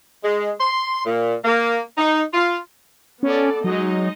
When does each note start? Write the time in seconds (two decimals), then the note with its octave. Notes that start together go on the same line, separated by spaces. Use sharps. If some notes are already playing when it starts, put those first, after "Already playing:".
0.24 G#3
0.60 C6
1.06 A#2
1.45 A#3
1.98 D#4
2.34 F4
3.23 B3 C#4 A4 D5
3.64 F#3 G#3 D#4 D#5